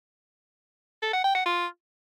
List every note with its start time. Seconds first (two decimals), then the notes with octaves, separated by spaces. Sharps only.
1.03 A4
1.13 F#5
1.24 G5
1.35 F#5
1.46 F4